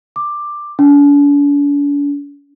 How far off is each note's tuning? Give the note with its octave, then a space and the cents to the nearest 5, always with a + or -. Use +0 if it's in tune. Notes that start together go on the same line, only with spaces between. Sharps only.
D6 +10
D4 -45